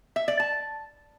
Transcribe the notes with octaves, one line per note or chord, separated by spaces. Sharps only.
E5
D5
A5